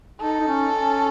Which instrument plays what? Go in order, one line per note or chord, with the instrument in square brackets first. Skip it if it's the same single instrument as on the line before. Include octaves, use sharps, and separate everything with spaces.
[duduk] D#4 [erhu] A4
[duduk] D#4
C#4
C#4